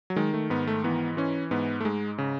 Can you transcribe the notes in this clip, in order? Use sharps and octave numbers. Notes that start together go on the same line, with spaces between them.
F#3
D#3 G#3
A3
G#2 B3
A3
E3 B3
E3 C#4
G#2 B3
A3
G#2 G#3
C#3